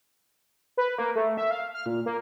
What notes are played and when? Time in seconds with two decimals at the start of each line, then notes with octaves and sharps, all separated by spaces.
0.77 B4
0.98 A#3
1.15 A3
1.37 E5
1.51 F5
1.74 F6
1.86 A#2
2.06 A#3